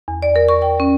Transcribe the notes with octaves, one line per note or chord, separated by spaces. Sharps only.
E2
D5
A#4
C#6
G5
C#4